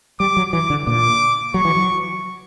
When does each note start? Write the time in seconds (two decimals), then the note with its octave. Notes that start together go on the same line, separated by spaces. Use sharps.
0.20 G3 D6
0.37 F#3
0.53 E3 D6
0.70 D3
0.87 A#2 D6
1.54 F#3 C#6
1.65 E3
1.75 F#3